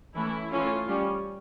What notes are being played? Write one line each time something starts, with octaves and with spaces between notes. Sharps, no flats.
E3 A3 C#4 E4
E3 A3 C#4 F4
G3 C#4